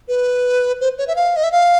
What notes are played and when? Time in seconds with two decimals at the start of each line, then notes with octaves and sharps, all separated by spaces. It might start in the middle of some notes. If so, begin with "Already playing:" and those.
0.08 B4
0.81 C5
0.98 C#5
1.08 E5
1.16 F5
1.36 D#5
1.44 E5
1.52 F5